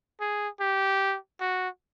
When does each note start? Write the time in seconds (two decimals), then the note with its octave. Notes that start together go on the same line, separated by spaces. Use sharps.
0.20 G#4
0.60 G4
1.40 F#4